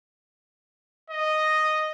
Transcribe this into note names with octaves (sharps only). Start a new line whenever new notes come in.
D#5